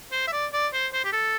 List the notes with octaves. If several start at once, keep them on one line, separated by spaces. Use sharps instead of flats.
C5
E5
D5
D5
C5
C5
G4
A4